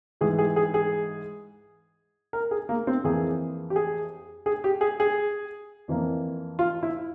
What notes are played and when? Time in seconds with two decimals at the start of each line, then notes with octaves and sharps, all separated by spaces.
0.21 G#2 E3 G#3 G#4
0.38 G#4
0.56 G#4
0.74 G#4
2.33 A#4
2.51 G#4
2.69 A#3
2.87 C4
3.04 F2 E3 A#3 G#4
3.70 G4
3.76 G#4
4.46 G#4
4.64 G4
4.81 G#4
5.00 G#4
5.88 F2 E3 A#3
6.59 F4
6.83 E4